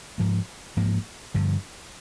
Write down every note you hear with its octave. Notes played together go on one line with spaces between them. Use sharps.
G#2 F3 A#3
G#2 F3 A#3
G2 D3 F3